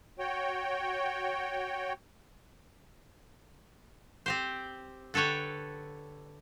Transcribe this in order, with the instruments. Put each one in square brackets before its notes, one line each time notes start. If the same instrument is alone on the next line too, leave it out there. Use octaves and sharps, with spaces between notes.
[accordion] F#4 C#5 G5
[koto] C4 G4 C5
D3 A4 B4 C#5 G5